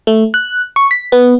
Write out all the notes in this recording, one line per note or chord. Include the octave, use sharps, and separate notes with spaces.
A3
F#6
C#6
B6
B3